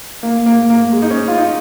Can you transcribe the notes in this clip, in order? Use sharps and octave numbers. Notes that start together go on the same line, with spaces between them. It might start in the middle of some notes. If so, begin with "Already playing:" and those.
A#3
A#3
A#3
G#3
D#4
C#4
F4
D#4